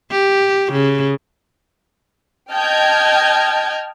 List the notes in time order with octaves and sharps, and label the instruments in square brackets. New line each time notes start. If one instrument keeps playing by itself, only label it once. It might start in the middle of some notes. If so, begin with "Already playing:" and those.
[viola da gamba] G4
C#3
[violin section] D#5 G5 A5 F6 G6 G#6